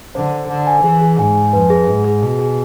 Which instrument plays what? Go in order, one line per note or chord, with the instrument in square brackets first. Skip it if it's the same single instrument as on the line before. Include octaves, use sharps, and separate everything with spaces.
[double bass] D3 [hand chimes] C5
[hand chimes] C5
[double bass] D3 [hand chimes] C5
[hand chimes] G#5
[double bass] E3 [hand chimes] G#4
[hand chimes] G#4
[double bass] G#2 [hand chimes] G#5
[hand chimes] G#5
[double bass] F2 [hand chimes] B4
[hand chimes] G#4
[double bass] G#2 [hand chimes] G#4
[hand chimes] G#4
[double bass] B2 [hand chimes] G#4
[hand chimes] G#4